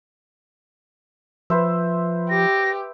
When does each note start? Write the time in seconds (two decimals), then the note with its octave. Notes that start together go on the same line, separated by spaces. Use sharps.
1.50 F3 B4 C5 E5
2.30 G4 A#6